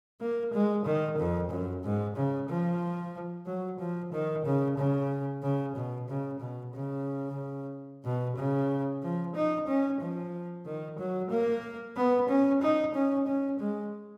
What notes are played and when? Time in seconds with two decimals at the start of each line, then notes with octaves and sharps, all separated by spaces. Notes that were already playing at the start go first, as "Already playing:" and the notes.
0.21 A#3
0.53 G#3
0.86 D#3
1.18 F2
1.51 F#2
1.84 G#2
2.16 C#3
2.49 F3
3.46 F#3
3.80 F3
4.12 D#3
4.45 C#3
4.77 C#3
5.43 C#3
5.75 B2
6.08 C#3
6.40 B2
6.74 C#3
8.05 B2
8.36 C#3
9.02 F3
9.35 D#4
9.68 C#4
10.01 F3
10.65 D#3
10.99 F#3
11.30 A#3
11.96 B3
12.29 C#4
12.61 D#4
12.94 C#4
13.27 C#4
13.60 G#3